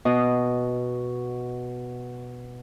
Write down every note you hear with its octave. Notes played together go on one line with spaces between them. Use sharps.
B2 D#5